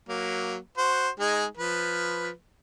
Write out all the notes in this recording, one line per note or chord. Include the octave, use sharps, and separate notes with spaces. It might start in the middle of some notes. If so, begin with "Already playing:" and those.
F#3 A#3
F#4 C5
G#3 D#4 G#4
F3 B4